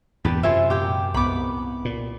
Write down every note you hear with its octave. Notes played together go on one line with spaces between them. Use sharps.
E2 G2 A#2 G4 B4 A5
F#2 C3 F4 C5 E5 G#5 C6
A#2 G4 G5
C2 G#2 B3 B5 D6
A#2